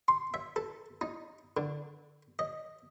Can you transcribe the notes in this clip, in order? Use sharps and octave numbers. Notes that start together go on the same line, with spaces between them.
C6
E5
A4
D#4
D3
D#5